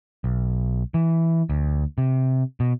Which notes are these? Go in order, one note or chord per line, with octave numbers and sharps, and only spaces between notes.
B1
E3
D2
C3
B2